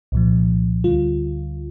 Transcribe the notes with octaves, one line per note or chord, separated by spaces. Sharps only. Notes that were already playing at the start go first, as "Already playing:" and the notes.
C2 A#2 F3
D2 D3 G3 F4